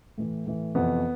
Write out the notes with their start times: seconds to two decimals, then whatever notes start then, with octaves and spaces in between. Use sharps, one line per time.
0.18 A2 E3
0.47 A2 E3
0.75 F2 C3 E3 B3